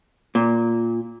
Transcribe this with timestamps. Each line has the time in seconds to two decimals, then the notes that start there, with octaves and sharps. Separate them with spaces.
0.35 A#2